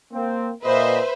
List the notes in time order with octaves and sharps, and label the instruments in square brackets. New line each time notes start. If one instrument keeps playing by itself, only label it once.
[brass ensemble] A#3 C4
[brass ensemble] A#2 D#5 [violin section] B4 C5 E5